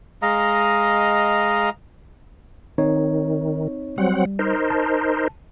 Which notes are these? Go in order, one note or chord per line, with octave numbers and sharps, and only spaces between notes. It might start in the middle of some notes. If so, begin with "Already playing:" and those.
G#3 D#5 F5 A#5
D#3 C4 D#4 C#5
F#3 G3 C4 F#5
D#4 A#4 C5
A5